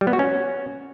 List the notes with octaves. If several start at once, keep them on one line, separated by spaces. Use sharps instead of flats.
G3
B3
F#4
C#4